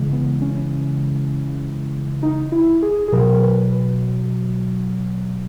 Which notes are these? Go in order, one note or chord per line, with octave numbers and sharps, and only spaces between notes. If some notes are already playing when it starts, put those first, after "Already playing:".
Already playing: C#3 E3 G#3
B3
C#4
D#4
E4
G#4
G#4
B2 F#3 A#4
A#4
B4
B4